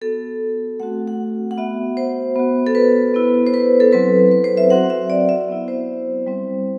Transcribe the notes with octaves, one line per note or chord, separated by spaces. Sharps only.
B3 F#4 A4
A3 C4 F#4 F#5
F#5
F#5
B3 F#4 E5
C5
B3 F#4
A4
B4
B3 E4
C5
B4
A4
F#3 C4 E4 B4
B4
C5
E5
F#3 C4 F#4 F#5
E5
D5
E5
B3 E4
C5
G3 C4 E4